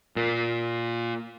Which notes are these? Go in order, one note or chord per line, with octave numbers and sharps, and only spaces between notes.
A#2